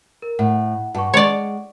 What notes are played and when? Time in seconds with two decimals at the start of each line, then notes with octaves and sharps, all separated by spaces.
0.22 A#4
0.39 A2 F#5
0.95 G2 F#5 C#6
1.14 G#3 C#5 D5